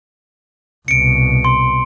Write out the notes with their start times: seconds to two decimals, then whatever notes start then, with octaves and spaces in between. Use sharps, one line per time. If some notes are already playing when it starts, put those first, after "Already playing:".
0.88 C2 B2 C#7 D7
1.44 C6